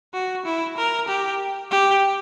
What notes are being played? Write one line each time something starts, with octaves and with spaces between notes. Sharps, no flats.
F#4
E4
A#4
G4
G4